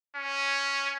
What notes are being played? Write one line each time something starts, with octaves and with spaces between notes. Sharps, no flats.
C#4